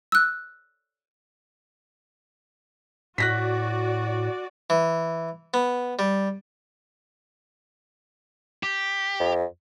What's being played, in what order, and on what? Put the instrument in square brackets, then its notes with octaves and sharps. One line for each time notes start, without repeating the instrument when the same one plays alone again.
[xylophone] E6 F#6
[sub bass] A2 [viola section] F#4 D5 [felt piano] F#6 A#6 B6
[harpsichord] E3
B3
G3
[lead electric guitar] G4
[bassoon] F2